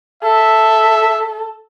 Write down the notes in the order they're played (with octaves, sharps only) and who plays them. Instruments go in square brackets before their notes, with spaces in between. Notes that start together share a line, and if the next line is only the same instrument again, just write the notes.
[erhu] A4 [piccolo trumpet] E5